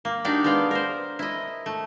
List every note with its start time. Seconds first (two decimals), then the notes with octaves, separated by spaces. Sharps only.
0.05 A#3
0.24 D4 D#4 F#4 G4 D5 F5
0.44 G#3 B3 D5 F5 G5
0.71 A#4 C5
1.19 E4 D#5
1.66 A3